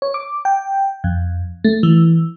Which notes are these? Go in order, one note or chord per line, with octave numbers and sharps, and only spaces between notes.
C#5
D6
G5
F2
A3
E3